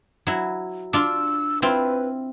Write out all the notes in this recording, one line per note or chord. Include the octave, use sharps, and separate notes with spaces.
F#3 E4
D4 F4 E6
C4 E4 F4 B4